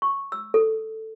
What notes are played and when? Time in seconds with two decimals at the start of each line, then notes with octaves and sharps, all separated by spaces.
0.02 C#6
0.32 E6
0.54 A4